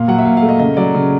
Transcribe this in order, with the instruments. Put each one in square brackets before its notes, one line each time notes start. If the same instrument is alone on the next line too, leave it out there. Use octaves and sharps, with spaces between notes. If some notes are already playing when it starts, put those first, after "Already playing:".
Already playing: [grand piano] A#2 F5
F#3 F#5
E5
A#2 F5
F5
A3
D#5
C#3 D#5
F#3 D5
C#3